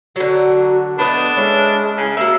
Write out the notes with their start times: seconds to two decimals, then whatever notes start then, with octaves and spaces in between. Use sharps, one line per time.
0.16 D3 F#3 F#4
0.99 A3 B3 D4 D#5 B5
1.36 G#3 C#4 E4
1.97 C#3
2.17 F#3 A#3 E5